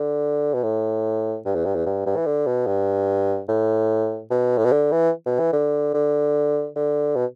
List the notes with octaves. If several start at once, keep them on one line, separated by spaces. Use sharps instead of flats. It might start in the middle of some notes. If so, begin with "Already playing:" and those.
Already playing: D3
B2
A2
G2
E2
G2
E2
G2
G2
E3
D3
B2
G2
A2
B2
A2
B2
D3
E3
B2
E3
D3
D3
D3
B2